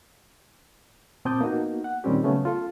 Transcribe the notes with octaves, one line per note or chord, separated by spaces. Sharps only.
A#2 C4 A5 D6 D#6 G6
A#3 B3 D#4 F#4
F#5
A#2 D#3 G3 C4 C#4 G4
C#3 F#3 A3 B3 C#4
F4 A4